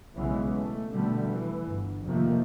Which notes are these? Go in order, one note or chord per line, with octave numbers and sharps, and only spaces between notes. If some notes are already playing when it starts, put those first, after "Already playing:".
B1 C#3 E3 G#3 B3
A3
B2 D3 G3 A3
E3
G1
F2 C3 D#3 F3 A3 A#3